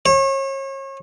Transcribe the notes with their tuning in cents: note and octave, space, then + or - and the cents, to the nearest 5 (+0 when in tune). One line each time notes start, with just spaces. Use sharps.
C#5 -35